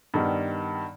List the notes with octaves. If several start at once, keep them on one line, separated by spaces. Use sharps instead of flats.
G2 D#3 G3 B3